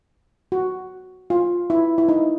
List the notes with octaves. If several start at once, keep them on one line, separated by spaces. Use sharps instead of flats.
F#4
F4
E4
E4
D#4